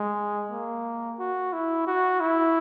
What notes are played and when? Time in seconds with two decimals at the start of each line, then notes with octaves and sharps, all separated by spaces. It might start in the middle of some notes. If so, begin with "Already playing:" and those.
Already playing: G#3
0.51 A#3
1.19 F#4
1.53 E4
1.87 F#4
2.20 E4